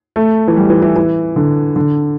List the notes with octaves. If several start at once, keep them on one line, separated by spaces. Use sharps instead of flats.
A3
E3
G3
E3
E3
E3
D3
D3